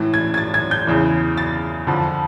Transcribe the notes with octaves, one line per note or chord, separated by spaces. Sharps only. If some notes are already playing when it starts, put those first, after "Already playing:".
Already playing: A2 E3
G#6
G#6
A6
G#6
G6
E2 C#3 E3
A6
F2 D3 F3